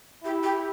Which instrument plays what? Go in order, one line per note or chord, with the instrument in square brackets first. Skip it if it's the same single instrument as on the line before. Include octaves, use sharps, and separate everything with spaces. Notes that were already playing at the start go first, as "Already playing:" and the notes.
[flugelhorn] E4 [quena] G4
[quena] G4